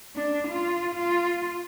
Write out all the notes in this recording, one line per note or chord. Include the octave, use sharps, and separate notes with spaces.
D4
F4
F4